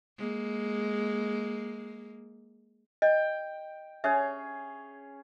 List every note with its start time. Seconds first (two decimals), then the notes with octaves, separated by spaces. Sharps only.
0.18 G#3 A#3
3.02 D#5 G5
4.04 C#4 G#4 C#5 E5